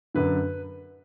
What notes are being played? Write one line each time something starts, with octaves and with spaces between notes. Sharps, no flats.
F#2 D3 B4